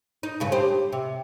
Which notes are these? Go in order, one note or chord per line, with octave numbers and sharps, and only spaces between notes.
D#4
G2 C#3 B4
G4 C5
C3